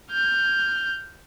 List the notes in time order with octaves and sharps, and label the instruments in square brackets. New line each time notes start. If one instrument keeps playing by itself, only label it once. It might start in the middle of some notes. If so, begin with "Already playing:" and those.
[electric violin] F6 G6